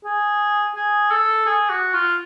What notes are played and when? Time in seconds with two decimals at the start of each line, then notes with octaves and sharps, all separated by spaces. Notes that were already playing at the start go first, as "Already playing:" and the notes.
0.05 G#4
0.76 G#4
1.11 A4
1.46 G#4
1.69 F#4
1.94 F4